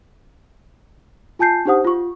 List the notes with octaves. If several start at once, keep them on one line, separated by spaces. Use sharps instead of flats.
F4 G#5 A5 G6 C7
D4 D#4 G4 C5 F#5 D#6
F4 C#6